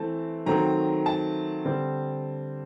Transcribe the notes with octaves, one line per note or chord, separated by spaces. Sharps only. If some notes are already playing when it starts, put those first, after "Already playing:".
Already playing: E3 A3 C4 A5
D#3 F#3 A3 C4 A#5
A5
D3 G3 C4